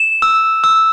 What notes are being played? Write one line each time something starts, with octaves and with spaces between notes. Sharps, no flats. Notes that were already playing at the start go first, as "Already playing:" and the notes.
Already playing: E7
E6
E6